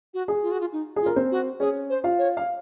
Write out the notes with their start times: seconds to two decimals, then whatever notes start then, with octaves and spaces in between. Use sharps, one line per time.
0.14 F#4
0.28 G#4
0.43 F4
0.52 F#4
0.60 F4
0.73 D#4
0.96 G#4
1.02 F4
1.06 A#4
1.16 C4 C5
1.31 F#4
1.60 C#4 G#4 C#5
1.89 C5
2.04 F4 F5
2.18 C#5
2.37 F5